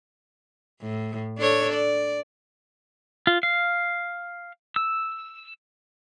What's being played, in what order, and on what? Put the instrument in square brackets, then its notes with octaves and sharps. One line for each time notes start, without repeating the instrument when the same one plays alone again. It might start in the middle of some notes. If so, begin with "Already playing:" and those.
[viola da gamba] A2
D4 A4 C#5
D5
[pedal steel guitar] F4
F5
E6